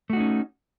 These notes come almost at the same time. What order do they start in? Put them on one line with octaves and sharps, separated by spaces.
A3 F#4 D#4 C#4